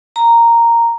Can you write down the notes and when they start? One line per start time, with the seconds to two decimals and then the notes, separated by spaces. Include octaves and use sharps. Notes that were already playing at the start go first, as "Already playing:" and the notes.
0.16 A#5